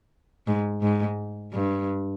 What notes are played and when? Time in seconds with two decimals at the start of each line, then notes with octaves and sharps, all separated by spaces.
0.47 G#2
0.82 G#2
1.53 G2